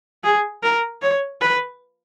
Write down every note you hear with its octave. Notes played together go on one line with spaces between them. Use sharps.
G#4
A#4
C#5
B4